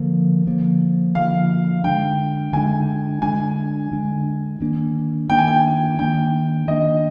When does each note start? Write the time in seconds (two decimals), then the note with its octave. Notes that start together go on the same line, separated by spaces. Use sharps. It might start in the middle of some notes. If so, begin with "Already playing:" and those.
Already playing: D3 F3 A#3
0.46 D3 F3 A#3
1.15 D3 F3 A#3 F5
1.84 D3 G#3 D4 G5
2.53 D3 G#3 D4 G#5
3.22 D3 G#3 D4 G#5
3.91 D3 G#3 D4
4.61 D#3 A#3 D4
5.30 D#3 A#3 D4 G5
5.38 G#5
5.48 G5
5.99 D#3 A#3 D4 G5
6.68 D#3 A#3 D4 D#5